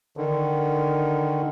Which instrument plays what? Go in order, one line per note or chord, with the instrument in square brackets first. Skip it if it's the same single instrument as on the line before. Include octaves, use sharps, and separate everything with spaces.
[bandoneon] D3 D#3